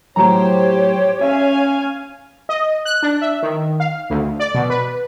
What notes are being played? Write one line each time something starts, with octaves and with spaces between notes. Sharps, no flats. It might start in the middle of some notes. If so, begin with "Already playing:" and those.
A2 F#3 G4 C5 C#5 A#5
C#4 E5 F5 G#5
D#5
F#6
D4
E5
D#3
F5
D2
D5
B2
B4